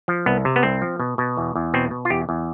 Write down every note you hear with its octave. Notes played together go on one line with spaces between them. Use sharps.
F3
C2 B3
C3
B3
C2 C4
F3
B2
B2
E2
E2
B2 C4
B2
F4
E2 G4
E2